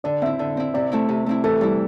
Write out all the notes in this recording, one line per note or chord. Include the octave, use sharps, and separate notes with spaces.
D3 D5
C4 E4 E5
D3
C4 E4
C3 D5
A3 C4 E4
C3
A3 C4 E4
E3 A4
G3 E4